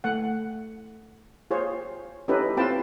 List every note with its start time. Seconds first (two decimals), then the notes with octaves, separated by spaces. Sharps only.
0.04 A3 F#5
1.51 F4 G#4 C5 C#5
2.28 C#4 D#4 E4 G4 A4 B4
2.57 C4 E4 F4 B4 G5 A5